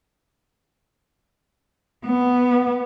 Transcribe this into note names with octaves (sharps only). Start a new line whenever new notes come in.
B3